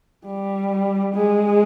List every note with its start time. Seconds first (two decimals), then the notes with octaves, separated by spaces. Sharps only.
0.25 G3
1.14 G#3